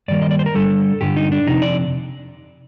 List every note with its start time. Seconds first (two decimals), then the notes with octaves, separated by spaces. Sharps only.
0.08 G2 D#3 G3 A#3 D5
0.22 D#5
0.31 D5
0.39 C5
0.46 A#4
0.55 G2 D3 G3 A4
1.01 G2 D3 G3 G4
1.16 D#4
1.32 D4
1.47 F2 C3 D#4
1.62 D5